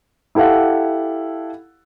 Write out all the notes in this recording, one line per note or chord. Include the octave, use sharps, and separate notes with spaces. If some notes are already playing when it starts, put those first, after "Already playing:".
E4 G4 A4 F5 F#5